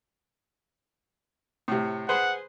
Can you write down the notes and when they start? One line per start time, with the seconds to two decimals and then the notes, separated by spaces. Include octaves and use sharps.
1.68 A2 C3
2.09 G#4 B4 C5 F#5